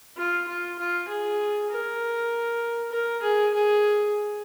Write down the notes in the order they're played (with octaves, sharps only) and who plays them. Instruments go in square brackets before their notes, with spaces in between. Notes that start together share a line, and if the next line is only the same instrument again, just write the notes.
[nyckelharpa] F4
F4
F4
G#4
A#4
A#4
G#4
G#4